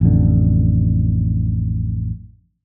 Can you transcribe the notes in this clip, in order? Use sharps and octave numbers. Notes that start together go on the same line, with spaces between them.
A1 F2 D3